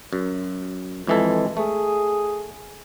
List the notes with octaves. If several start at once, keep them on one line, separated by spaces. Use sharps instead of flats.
F#2
F2 E3 G#3 A4
A3 G#4